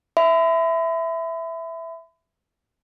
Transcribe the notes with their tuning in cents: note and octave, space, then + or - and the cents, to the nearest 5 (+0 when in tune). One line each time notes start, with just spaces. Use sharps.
E5 +0 B5 +40